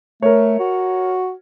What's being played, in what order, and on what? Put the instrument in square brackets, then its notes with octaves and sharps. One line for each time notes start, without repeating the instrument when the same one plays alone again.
[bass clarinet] A3 [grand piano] A#4 C#5
[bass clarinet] F#4